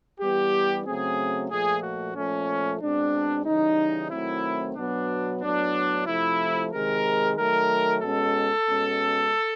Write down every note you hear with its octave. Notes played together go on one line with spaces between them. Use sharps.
E3 G3 B3 G4
C#3 F#3 A3 C4 G#4
A#2 F3 A3 G#4
F#4
A#2 F3 A3 C#4
B2 G#3 C4 D4
C#3 E3 G3 D#4
D#3 F#3 A3 C4 E4
B2 F#3 B3 D4
A2 F#3 B3 D4
C3 F3 A3 E4
C3 D#3 G#3 A#4
D#3 F#3 A3 A#4
B2 G#3 C#4 A4
B2 G#3 C#4